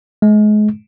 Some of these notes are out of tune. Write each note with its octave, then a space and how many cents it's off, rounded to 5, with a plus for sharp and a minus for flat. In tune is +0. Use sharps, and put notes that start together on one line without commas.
G#3 +30